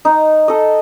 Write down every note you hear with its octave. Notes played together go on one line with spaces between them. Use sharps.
D#4
A4 D#5